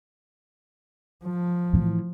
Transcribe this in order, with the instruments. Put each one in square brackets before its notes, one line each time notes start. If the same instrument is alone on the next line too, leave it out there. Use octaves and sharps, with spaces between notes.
[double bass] F3
[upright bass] A2 E3